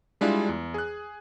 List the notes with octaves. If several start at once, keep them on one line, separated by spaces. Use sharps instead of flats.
G3 G#3 D4 E4 F4
E2
G#4 F#6